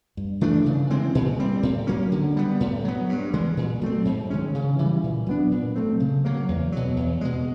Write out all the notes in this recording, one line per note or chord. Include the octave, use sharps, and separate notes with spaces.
G2
E3 A3 D4
C#3
E3 G#3 C4
A#2
G3 C4
A2
F#3 A#3 C#4
D3
G3 B3
A2
F#3 B3
G2
E3 G#3
A#2
F#3 A3 C4
G#2
D#3 G#3 C#4
C#3
E3 G3
A#2
F#3 B3 D4
A#2
F#3 A3 C4
C#3
F#3 A#3
E2
B2 F#3
E2
B2 G#3